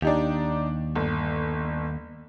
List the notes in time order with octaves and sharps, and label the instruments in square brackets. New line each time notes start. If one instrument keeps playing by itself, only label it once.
[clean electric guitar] D#2 [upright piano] D4 D#4 G4
[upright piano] G1